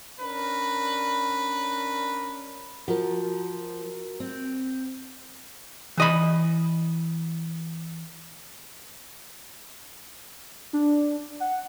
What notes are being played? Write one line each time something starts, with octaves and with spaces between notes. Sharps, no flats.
C#4 D4 A#4 B4
F3 F#4 A#4
C4
E3 D#5 B5
D4
F#5